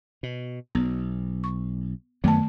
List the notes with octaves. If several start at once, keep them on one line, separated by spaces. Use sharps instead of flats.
B2
B1 B3
C#6
F#2 D#3 F#3 A3 B3 A5